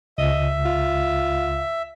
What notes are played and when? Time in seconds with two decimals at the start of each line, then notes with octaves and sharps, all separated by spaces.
0.18 C#2 D#5 E5
0.65 F4